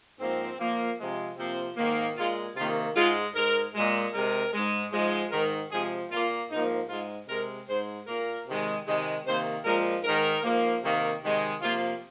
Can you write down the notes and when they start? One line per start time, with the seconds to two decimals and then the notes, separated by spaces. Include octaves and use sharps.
0.19 G#2 F3 A#3 C4
0.59 A#2 F3 A#3
0.98 C3 F3 G#3
1.37 C3 F3 A#3 C4
1.76 G#2 D#3 A#3
2.16 A#2 G#3 F4
2.55 C3 D#3 A#3 F4
2.94 G#2 G#3 F4
3.34 G#2 G#3 A#4
3.74 A#2 G#3
4.13 C3 G#3 A#4
4.53 G#2 G#3
4.92 G#2 F3 G#3
5.31 G#2 D#3 G#3 A#4
5.70 C3 F3 G#3 G#4
6.10 A#2 A#3 F4
6.49 G#2 F3 A#3 D#4
6.89 G#2 G#3 F4
7.28 C3 G#3 A#4
7.67 G#2 G#3 C5
8.07 A#2 A#3 A#4
8.46 C3 D#3 G#3
8.86 C3 D#3 G#3
9.25 C3 D#3 A#3 C5
9.64 A#2 F3 G#3 A#4
10.03 G#2 D#3 G#3 A#4
10.43 G#2 F3 A#3
10.83 C3 D#3 A#3
11.22 C3 D#3 G#3
11.61 C3 F3 A#3 F4